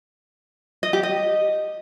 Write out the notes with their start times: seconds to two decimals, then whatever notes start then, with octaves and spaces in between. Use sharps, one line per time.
0.83 D#5
0.93 G4
1.03 D#5